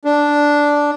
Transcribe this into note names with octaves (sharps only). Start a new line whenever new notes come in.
D4